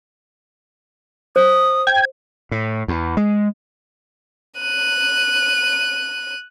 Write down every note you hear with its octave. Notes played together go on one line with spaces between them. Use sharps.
C5 D#6
G5 G#6
A2
E2
G#3
F#6 D#7